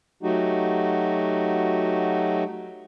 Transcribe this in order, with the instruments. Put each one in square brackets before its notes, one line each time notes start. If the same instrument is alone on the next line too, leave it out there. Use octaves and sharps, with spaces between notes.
[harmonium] F#3 A3 D#4 F#4 G4